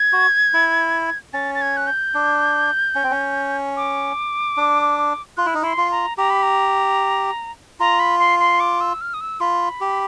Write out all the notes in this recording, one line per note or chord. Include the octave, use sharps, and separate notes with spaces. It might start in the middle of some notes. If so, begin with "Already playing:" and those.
Already playing: G#6
F#4
E4
C#4 A6
A6
G#6
F#6
G6
D4
C#4
C4
C#4
D6
D4
F4 F#6
E4
D#4
E4 C6
F4
A#5
G4 A#5
B5
A#5
F4 A#5
B5
C6
C6
D6
E6
F6
D#6
E6
F4 B5
G4